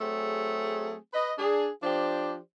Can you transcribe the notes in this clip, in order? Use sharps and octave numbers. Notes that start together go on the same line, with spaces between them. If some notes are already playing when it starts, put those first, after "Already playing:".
F#3 A3 C4 G#4
B4 D#5
D4 G#4
F3 D4 G4 C5 D5